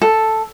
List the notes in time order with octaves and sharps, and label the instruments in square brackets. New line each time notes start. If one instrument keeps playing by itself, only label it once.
[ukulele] A4